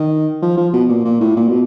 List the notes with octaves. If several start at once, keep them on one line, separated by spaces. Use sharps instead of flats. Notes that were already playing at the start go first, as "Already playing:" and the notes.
Already playing: D#3
F3
F3
B2
A#2
A#2
A2
A#2
B2